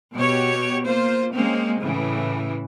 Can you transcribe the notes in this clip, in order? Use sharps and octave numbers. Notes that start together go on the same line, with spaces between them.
B2 F#4 G4 C#5
A#3 F4 C5
G#3 A#3 C4 C#4
A2 C#3 E3